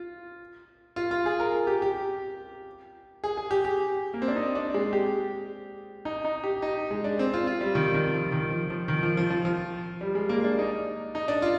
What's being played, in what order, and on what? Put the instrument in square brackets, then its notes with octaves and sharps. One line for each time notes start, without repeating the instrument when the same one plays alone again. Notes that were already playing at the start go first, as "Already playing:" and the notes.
Already playing: [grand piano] F4
F4
F4
G#4
A#4
G4
G4
G#4
G#4
G4
G4
A#3
C4
D4
D#4
D4
G#3
G4
D#4
D#4
G4
D#4
G#3
D4
C4
F4
F4
G3
D#3
D#3
F3
D#3
F3
F3
D#3
F3
F3
F3
F3
G3
G#3
A#3
D4
D#4
D#4
D4
F4